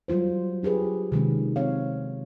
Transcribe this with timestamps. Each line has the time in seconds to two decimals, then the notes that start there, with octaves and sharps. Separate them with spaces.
0.08 F#3 G3 F4 C5
0.63 D4 G4 G#4 B4
1.12 C3 D#3 G#3 C#4
1.56 C4 C#5 F5